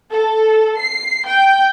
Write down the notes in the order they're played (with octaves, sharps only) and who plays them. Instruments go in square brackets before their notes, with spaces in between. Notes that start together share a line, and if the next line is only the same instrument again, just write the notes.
[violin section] A4
C7
G5